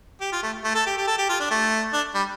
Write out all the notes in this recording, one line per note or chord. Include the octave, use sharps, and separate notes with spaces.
G4
F4
A3
A3
A4
G4
G4
A4
G4
F4
D4
A3
D4
G3